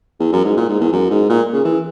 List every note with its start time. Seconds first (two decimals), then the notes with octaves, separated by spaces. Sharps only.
0.20 E2
0.33 F#2
0.44 G#2
0.57 A#2
0.69 G#2
0.80 E2
0.92 F#2
1.10 G#2
1.29 A#2
1.53 C#3
1.65 E3